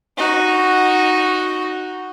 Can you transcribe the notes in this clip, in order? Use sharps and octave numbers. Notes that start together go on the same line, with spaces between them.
D#4 F#4